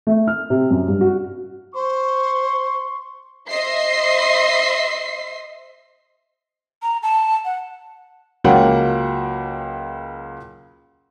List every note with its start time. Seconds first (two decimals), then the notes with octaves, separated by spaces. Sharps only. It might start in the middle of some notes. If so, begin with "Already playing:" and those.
0.07 A3
0.27 F6
0.50 C3
0.71 F#2
0.88 G2
1.01 F#4
1.75 C5 C6 C#6
3.49 C5 D#5 E5 C6 C7
6.83 A#5
7.03 A5
7.45 F#5
8.44 C#2 F#3 A#3 F#5 G5